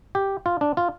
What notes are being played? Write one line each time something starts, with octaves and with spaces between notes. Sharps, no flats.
G4
F4
D4
F4